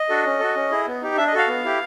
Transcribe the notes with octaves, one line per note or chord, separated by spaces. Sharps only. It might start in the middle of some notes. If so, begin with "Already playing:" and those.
Already playing: D#5
D4 F#4 A4
C#4
F#4 A4
C#4
E4 G#4
B3
D#4 G4
D4 E5
D#5
F#4 A4 F5
B3
E4 G4